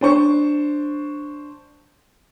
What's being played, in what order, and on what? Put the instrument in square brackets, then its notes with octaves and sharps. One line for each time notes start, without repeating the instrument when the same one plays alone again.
[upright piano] D4 C5 C#6